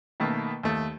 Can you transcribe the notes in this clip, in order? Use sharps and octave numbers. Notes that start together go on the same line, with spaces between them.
B2 D#3 A3 A#3
D#2 A3